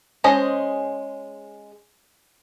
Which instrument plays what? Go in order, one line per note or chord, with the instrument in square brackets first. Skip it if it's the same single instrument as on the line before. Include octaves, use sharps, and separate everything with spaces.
[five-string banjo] G#3 C#4 G#4 C5 D#5